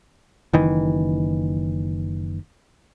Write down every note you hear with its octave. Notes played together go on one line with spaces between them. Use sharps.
F#1 D#3 E3